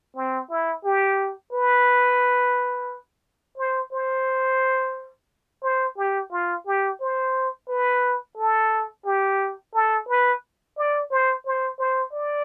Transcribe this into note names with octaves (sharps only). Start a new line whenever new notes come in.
C4
E4
G4
B4
C5
C5
C5
G4
F4
G4
C5
B4
A4
G4
A4
B4
D5
C5
C5
C5
D5